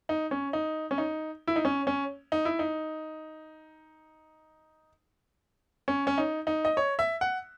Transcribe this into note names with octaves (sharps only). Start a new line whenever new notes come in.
D#4
C#4
D#4
C#4
D#4
E4
D#4
C#4
C#4
D#4
E4
D#4
C#4
C#4
D#4
D#4
D#5
C#5
E5
F#5